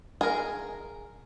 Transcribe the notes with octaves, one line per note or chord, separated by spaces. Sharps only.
G#4 A#4